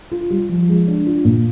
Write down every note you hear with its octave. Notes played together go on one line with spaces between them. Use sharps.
F4
G3
F3
G#3
D4
F4
A#2